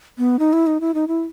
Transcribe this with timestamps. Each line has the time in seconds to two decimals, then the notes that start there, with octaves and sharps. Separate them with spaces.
0.18 B3
0.39 D#4
0.53 E4
0.67 D#4
0.81 E4
0.94 D#4
1.08 E4